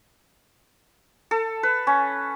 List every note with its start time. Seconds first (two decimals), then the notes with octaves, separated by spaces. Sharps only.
1.31 A4
1.63 B4
1.87 C#4